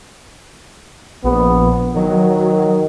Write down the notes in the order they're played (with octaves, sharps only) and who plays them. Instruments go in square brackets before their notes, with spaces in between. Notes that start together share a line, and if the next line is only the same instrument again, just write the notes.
[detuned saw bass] A#1 [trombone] B3
[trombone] D#3 [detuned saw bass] F#3